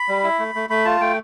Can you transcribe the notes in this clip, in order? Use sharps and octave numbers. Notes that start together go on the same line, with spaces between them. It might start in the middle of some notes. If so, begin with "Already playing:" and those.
Already playing: B5
G3
E4
A3
A3
A3 B5
F4 A5
A3 G5